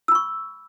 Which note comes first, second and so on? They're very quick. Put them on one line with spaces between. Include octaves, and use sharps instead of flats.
E6 B5 C#6